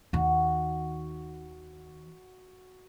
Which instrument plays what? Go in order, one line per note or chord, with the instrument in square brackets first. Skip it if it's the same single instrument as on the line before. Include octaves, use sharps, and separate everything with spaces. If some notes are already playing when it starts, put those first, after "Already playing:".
[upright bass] D#2 D#3 [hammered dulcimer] F#4